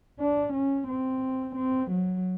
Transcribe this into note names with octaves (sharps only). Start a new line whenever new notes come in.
D4
C#4
C4
C4
F#3